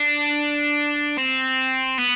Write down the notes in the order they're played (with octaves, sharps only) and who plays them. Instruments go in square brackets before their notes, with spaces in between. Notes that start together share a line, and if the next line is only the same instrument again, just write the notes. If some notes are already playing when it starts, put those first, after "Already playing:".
Already playing: [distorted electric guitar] D4
C4
B3